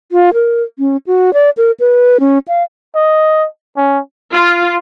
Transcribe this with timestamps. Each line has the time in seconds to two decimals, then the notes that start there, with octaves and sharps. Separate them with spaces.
0.12 F4
0.34 A#4
0.79 C#4
1.07 F#4
1.34 D5
1.57 A#4
1.80 B4
2.20 C#4
2.48 F5
2.95 D#5
3.77 C#4
4.32 F4